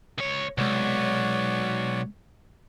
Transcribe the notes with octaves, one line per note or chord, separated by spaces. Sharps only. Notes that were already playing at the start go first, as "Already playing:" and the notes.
C#2 C#5
B1 C3 G#3 C#5 D5 F#5